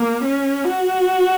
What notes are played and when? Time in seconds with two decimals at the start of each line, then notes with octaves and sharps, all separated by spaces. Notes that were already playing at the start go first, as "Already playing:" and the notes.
Already playing: A#3
0.23 C#4
0.65 F#4